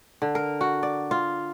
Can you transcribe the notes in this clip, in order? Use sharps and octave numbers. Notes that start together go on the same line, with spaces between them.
D3
A#4
F#4
D5
F4